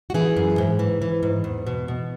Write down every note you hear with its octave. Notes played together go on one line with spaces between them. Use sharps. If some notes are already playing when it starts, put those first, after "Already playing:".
F#4
E3 E4 G#4
F#2
G#2
E3
E3
G#2
E2
B2
B2